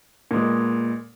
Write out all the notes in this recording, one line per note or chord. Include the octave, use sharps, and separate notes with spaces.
A#2 G#3 B3